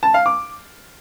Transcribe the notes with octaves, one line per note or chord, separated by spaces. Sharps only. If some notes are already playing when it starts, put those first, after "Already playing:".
A5
F5
D6